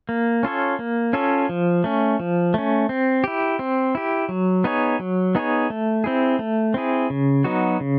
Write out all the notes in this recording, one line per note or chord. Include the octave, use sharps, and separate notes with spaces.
A#3
C#4 F4 A4 C#5
A#3
C#4 F4 A4 C#5
F3
A3 C#4
F3
A3 C#4
C4
E4 G4
C4
E4 G4
F#3
B3 D#4 G#4 C#5
F#3
B3 D#4 G#4 C#5
A3
C4 E4 G#4
A3
C4 E4 G#4
C#3
F#3 B3 D#4 F#4
C#3